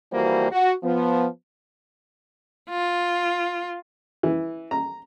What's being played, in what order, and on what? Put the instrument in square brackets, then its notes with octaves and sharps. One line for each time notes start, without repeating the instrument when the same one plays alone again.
[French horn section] F2 E3 G3 A#3 F#4 C5
F#4
F3 B3
[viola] F4
[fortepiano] E3
A#5